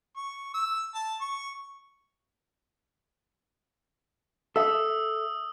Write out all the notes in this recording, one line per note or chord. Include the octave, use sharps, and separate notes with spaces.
C#6
E6
A5
C#6
A4 E5 D#6 E6